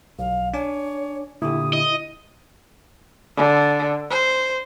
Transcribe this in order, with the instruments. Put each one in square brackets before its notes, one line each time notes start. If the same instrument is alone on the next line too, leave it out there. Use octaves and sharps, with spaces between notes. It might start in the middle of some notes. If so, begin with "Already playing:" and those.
[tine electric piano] B1 [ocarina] F5
[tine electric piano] D4 G#5 D6 [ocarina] C#5
[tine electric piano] A#2 D3 G4 [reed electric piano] E4 [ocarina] D#6
[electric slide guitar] D#5
[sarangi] D3
C5